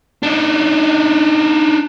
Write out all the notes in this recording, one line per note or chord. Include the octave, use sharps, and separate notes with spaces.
D4 D#4